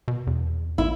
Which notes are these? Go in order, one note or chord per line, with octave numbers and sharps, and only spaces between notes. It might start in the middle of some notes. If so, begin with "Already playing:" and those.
B2
E2
A1 E4